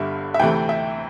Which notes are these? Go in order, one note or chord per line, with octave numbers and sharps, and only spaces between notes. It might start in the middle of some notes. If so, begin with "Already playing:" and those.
Already playing: G1 G2 D3 G3 E5
E5
D2 C3 E3 A3 G5
E5